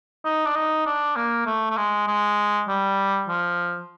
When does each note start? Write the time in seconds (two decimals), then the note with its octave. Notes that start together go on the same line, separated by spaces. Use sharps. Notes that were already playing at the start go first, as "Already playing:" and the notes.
0.25 D#4
0.45 D4
0.55 D#4
0.86 D4
1.16 A#3
1.46 A3
1.70 A3
1.77 G#3
2.07 G#3
2.68 G3
3.28 F3